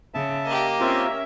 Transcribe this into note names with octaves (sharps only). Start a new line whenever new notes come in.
C#3 E5 A5
A#3 G4 D#5
C4 C#4 F4 A#4 E5